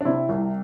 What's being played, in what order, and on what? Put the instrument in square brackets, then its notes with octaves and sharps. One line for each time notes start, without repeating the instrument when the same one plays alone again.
[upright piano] D4
C3 C4 E4
C2